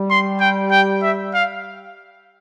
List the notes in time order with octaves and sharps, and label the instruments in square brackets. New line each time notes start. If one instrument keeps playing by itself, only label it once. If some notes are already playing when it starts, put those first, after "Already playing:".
Already playing: [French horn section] G3
[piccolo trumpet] C6
G5
G5
E5
F5